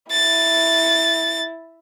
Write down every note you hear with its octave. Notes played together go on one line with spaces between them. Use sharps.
E4 A6